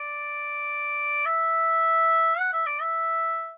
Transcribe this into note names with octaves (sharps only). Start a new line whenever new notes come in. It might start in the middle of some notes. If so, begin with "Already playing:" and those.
Already playing: D5
E5
F#5
E5
D5
E5